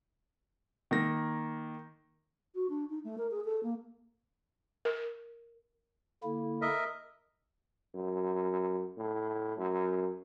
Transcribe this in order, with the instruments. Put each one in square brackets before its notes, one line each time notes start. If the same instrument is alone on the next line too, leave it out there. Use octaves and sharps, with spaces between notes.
[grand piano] D#3 A#3 A#6
[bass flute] F#4
D4
D#4
A3
A#4
G#4
A4
A#3
[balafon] A#4
[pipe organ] D3 A#3 E4
[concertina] A#4 D#5 E5
[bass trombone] F#2
A2
F#2